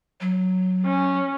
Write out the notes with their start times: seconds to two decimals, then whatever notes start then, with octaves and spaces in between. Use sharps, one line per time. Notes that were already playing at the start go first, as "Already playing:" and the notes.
0.21 F#3
0.86 C#4